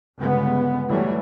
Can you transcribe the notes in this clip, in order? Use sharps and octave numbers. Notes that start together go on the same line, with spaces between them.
G1 C#3 G#3 B3
E2 E3 F#3 G3 A3